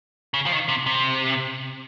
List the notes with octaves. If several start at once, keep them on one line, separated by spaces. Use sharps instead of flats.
C#3
F3
D#3
C3
C3